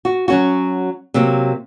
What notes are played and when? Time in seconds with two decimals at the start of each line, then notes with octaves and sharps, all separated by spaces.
0.05 F#4
0.28 F#3 C#4 F#4
1.14 C3 F#3 A#3